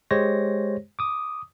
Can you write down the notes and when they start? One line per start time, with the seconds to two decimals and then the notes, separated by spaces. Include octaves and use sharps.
0.11 G#3 G4 C5 C#5 A#6
0.99 D6 D#6